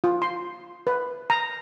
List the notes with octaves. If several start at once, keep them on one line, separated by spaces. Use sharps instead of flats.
F4
C6
B4
A#5